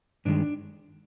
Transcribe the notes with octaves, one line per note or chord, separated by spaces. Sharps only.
G2 D#3 G#3 D4